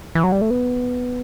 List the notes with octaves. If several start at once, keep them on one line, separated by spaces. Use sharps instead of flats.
E3
F#3
G3
A3
B3